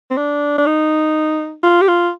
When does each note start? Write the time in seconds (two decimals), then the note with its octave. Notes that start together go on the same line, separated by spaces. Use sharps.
0.11 C4
0.17 D4
0.58 D4
0.67 D#4
1.63 F4
1.81 G4
1.88 F4